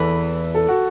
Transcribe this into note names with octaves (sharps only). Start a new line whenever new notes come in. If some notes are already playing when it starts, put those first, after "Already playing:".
Already playing: E2 E3 A4
A4
F#4